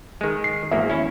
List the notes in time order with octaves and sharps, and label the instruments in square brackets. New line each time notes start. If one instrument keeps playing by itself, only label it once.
[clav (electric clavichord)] D#3 G#3
[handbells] C7
[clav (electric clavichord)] G#1 E2 A#3 [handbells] E5
[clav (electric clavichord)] C#4 E4